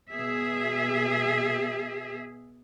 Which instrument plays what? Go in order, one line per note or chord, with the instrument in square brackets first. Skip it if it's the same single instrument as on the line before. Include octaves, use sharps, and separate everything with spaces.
[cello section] B2 G#4 E5